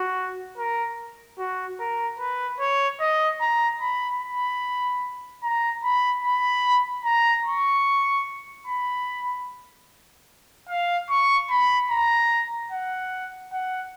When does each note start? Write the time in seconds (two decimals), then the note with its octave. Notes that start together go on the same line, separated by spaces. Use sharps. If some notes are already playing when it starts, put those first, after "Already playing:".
Already playing: F#4
0.58 A#4
1.38 F#4
1.80 A#4
2.19 B4
2.60 C#5
3.00 D#5
3.41 A#5
3.81 B5
4.22 B5
5.44 A#5
5.84 B5
6.24 B5
7.05 A#5
7.46 C#6
8.67 B5
10.69 F5
11.10 C#6
11.50 B5
11.90 A#5
12.72 F#5
13.52 F#5